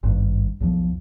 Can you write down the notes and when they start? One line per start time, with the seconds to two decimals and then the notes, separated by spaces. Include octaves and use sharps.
0.03 G#1 G2
0.60 B1 E2 F3